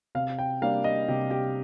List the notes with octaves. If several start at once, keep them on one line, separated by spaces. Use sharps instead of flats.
C3 F5
G5
G3 A#3 D4 F5
D#5
C3 G4
G4